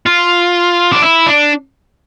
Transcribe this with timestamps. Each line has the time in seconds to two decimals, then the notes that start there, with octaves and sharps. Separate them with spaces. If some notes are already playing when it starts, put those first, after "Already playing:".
0.06 F4
0.92 D4
1.02 E4
1.27 D4